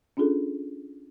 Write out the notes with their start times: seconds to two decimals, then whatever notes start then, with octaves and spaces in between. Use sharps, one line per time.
0.17 C#4 D4 F4 G#4 A4